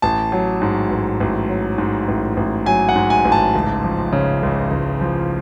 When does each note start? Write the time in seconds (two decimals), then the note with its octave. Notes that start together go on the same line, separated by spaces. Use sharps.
0.02 A1 A5
0.32 F#3
0.62 G#2
0.91 A1
1.20 A1
1.49 F#3
1.78 G#2
2.08 A1
2.37 A1
2.66 F#3 G#5
2.89 F#5
2.96 G#2
3.10 G#5
3.25 A1
3.32 A5
3.55 C#2
3.84 F3
4.12 C#3
4.43 C#2
4.71 C#2
5.01 F3